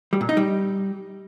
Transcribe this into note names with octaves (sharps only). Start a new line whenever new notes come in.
G3
A#2
D#4
G3